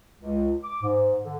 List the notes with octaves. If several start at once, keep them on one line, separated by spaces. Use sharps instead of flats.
C#2
D6
G#2
D3